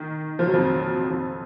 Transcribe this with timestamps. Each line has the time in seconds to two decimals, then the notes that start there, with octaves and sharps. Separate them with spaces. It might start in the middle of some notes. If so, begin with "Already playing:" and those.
Already playing: D#3
0.39 F3
0.46 F#3
0.54 F2 F3
1.09 F2 F3